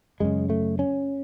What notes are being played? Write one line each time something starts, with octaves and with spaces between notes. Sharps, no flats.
F#2 C#3 G#3
A3
C#4